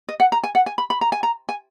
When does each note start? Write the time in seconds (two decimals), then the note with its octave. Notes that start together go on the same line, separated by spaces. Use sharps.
0.09 D#5
0.20 F#5
0.32 A#5
0.44 G#5
0.55 F#5
0.66 G#5
0.78 B5
0.90 B5
1.01 A#5
1.12 G#5
1.23 A#5
1.49 G#5